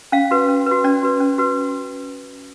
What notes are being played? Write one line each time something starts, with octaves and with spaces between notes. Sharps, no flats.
C#4 F5
F#4 B4
C#4
F#4 B4
C#4 D5
F#4 B4
C#4
F#4 B4